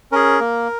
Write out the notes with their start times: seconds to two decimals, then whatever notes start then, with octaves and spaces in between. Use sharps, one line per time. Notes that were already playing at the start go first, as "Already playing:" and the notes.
0.12 C#4 G#4 A#4
0.40 A#3